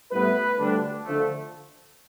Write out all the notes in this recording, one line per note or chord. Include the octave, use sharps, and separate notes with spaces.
A2 G3 B3 E4 B4
D2 D3 G3 D4
D3 F3 A3